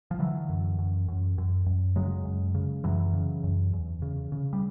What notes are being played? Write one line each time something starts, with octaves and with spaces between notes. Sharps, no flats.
F3
D3 E3 F#3
F#2
F#2
F#2
F#2
F#2
C#3 F#3 G#3
F#2
C#3
F#2 E3 F#3
C#3
F#2
E2
C#3
C#3
G3